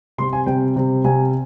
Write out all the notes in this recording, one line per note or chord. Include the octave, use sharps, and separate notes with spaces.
C3 G3 C4 C6
G#5
C3 G3 C4 G5
C3 G3 C4
C3 G3 C4 G#5